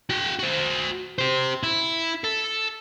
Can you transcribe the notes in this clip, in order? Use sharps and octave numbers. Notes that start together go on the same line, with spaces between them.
F#4 G5
F#4 C5
G4 C5
E4
A4